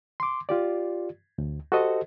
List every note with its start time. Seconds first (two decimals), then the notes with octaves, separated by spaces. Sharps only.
0.20 C6 D6
0.49 F4 G4 D5
1.38 D2
1.72 F#4 G4 A4 C5 D#5